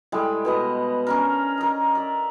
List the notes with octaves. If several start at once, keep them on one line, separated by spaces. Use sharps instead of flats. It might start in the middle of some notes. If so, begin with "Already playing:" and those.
A2 G3 G#3
B2 B3 D#5
C#4 D4 A#4
A#4 D#5
D5 E5